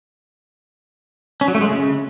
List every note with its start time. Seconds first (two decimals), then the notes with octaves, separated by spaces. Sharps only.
1.41 C#4
1.48 F#3
1.55 A3
1.61 G#3
1.68 C#3